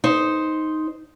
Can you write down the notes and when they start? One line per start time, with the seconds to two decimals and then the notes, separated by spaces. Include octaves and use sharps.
0.04 D#4 C5